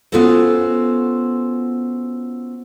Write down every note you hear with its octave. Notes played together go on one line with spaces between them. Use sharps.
B3 C#4 F4 F#4 A4 C5